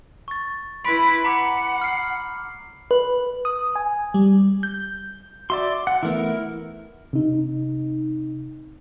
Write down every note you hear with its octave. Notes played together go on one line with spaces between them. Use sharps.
C#6 A6
E4 B4 B5 C6 D7
F#5 A#5 B5 D6
F6 C7
B4
D#6
G#5
G3
G6
F#4 D5 E5 C6
F#5
E3 A3 B3 E4 A#4
C3 D#4